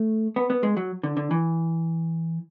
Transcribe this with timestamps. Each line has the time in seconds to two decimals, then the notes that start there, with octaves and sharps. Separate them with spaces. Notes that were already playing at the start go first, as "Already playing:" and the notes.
Already playing: A3
0.36 B3
0.50 B3
0.63 G#3
0.77 F#3
1.03 D3
1.17 D3
1.31 E3